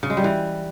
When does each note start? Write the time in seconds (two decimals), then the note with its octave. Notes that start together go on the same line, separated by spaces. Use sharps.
0.03 C#3
0.10 G#3
0.17 G3
0.24 E3